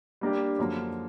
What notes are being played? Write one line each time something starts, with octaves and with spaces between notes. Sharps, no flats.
G3 A#3 D4 G4
F#2 D3 F3 A#3